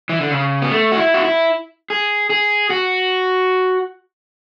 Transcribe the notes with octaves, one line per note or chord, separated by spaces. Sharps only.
E3
D3
C#3
B3
A3
F#4
E4
F#4
E4
G#4
G#4
F#4